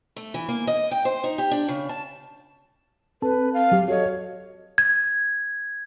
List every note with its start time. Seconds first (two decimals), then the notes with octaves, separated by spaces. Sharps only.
0.16 A3
0.34 E3
0.48 A#3
0.67 D#5
0.91 G5
1.05 C5
1.24 D#4
1.38 G4
1.51 D4
1.68 C#3
1.89 A5
3.22 C4 A4 B4 A5
3.54 F5
3.71 F#3 G4
3.88 F#4 A4 C#5 D#5
4.78 G#6